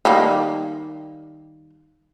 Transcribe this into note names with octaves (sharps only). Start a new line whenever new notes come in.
D#3 G3 A#3